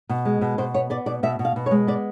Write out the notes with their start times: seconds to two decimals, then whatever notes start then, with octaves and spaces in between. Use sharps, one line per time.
0.09 B2
0.25 G#3
0.41 B2
0.58 B2 C5
0.74 B3 C#5
0.90 B3 D5
1.06 B2 D5
1.23 B2 E5
1.39 B2
1.45 F5
1.56 B2
1.66 C#5
1.71 G#3
1.87 B3 D5